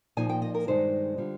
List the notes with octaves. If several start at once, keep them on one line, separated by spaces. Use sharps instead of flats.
A#2 F3 A#3 D#4 G#5
G5
D#5
A#4
G2 D#3 G#3 D#4 C5
D3 G3 D4 F4